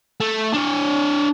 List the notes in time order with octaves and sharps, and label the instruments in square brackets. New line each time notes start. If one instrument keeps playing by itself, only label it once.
[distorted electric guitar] A3
D4 C#5